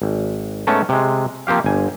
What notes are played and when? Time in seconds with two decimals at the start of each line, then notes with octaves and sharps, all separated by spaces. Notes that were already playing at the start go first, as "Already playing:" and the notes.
0.02 G#1
0.67 G#2 A3 B3 C#4 A5 A#5
0.89 C3 G#3
1.47 F3 A#3 C4 G4 F5
1.64 G1 G#5